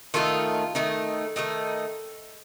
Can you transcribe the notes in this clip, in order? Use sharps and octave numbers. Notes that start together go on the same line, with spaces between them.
D#3 A3 D#4 F4 A4
D#3 A3 D#4
D#3 A3 D#4